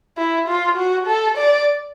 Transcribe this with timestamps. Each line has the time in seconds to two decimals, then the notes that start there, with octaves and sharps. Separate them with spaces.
0.18 E4
0.48 F4
0.77 F#4
1.07 A4
1.37 D5